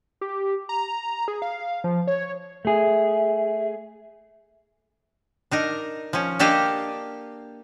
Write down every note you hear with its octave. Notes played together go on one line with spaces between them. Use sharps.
G4
A#5
G#4
F5
F3
C#5
A3 G#4 E5
D4 D#4 A#4
F3 C#4
A#3 D4 G4 A4 D#5 F5